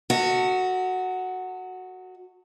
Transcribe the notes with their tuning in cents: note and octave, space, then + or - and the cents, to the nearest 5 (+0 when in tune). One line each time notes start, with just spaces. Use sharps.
F#4 +0 A4 +45 D#5 +45